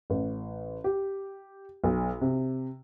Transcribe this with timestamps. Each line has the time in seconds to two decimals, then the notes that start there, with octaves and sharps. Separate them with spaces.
0.10 A1
0.84 G4
1.84 B1
2.21 C3